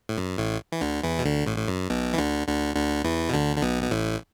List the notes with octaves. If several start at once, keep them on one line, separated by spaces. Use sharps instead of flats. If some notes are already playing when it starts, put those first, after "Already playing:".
A2
F#2
A1 A2
E3
D2 D3
E2 E3
B2
D2 D3
A1 A2
A2
F#2
B1 B2
E3
D2 D3
D2 D3
D2 D3
E2 E3
B2
D2 D3
D3
B1 B2
B2
A1 A2